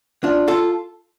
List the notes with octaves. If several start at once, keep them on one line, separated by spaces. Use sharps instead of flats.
D4 F4
F4 A4